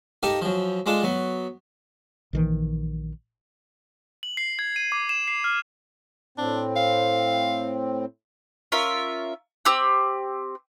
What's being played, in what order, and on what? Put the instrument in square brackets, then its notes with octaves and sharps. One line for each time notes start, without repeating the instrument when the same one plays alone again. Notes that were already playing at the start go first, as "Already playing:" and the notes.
[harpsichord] D#4 G4 A4 A#4 F5
F#2 F3
G#3 D4 F4 A4
F#3 B3
[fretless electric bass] A#1 D#3 E3
[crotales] F#7
C7
G#6
D#7
D6
E7
C7
F6
[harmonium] A2 C4 [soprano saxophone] D4
[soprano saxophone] F5
[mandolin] C#4 F4 A#4 E5
C4 G4 E6